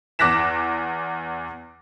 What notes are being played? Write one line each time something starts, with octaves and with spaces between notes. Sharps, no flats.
E2 D6 F#6 A#6 B6 E7